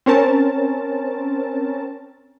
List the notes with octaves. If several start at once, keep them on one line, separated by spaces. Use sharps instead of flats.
C4 C#4 A#4 A5